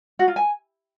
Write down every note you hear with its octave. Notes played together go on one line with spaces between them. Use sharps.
F#4
F4
G#5